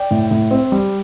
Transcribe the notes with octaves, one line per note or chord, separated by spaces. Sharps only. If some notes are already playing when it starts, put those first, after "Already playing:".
Already playing: D5 G5
A2
A2
C4
G3